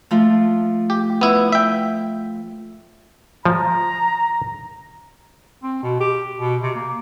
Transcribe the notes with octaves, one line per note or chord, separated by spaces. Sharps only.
F3 A3 F4
G4
B3 E4
E5 G5
F3 A#5
C4
B2
G4
B2
C3
A#3